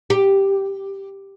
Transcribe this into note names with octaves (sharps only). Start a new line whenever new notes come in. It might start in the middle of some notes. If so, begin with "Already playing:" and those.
G4